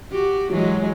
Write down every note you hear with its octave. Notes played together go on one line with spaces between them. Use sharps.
F#4 G4
E3 F#3 G#3